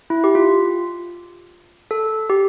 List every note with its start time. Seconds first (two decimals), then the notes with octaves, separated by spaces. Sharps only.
0.10 E4
0.24 G4
0.35 F4
1.91 A4
2.30 G4